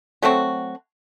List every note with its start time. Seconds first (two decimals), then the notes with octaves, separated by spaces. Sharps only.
0.22 F#3 A3 C4 F#4